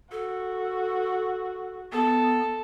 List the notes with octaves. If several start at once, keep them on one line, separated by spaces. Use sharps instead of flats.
F#4 A4
B3 A4